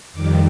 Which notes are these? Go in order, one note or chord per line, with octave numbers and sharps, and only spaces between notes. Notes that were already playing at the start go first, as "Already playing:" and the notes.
F2 D#3 G3 D6